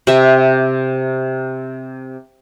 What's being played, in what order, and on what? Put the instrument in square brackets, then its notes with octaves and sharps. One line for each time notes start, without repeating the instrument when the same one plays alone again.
[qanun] C3 E5